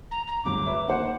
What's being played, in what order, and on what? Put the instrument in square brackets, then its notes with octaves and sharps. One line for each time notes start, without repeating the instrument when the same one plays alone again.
[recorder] A#5
A#5
[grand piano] D1 G1 A#5 [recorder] D6
[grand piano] B4 C#5 E5
[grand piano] D#2 B4 C5 [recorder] F#5